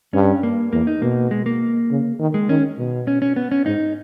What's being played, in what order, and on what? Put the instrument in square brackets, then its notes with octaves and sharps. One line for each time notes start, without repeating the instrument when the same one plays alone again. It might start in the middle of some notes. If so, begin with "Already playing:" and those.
[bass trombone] G2 [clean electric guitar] C#4
[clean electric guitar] A#3
[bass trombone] E2 [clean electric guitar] A#3
[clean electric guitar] D#4
[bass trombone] B2 [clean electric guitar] A#3
[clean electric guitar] G#3
A#3
[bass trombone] C#3
D#3
[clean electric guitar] G#3
[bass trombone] D#3 [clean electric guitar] C#4
[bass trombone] B2
[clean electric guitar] C#4
C#4
B3
C#4
[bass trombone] G#2 [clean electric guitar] D#4